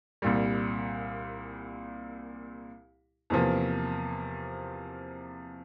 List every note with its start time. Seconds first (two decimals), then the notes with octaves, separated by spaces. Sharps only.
0.22 C2 A#2 G3
3.30 E2 C3 F3 A#3